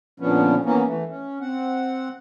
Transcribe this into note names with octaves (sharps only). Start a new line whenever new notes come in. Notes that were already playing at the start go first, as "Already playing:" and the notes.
A#2 D3 F3 B3 C#4
E3 A#3 B3 C#4
E3 A3
C#4
C4 F#5